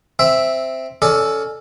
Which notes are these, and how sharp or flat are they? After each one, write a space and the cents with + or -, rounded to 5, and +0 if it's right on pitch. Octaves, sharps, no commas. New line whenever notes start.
C4 +0 E5 +0
C#4 +20 A4 +0 D5 +40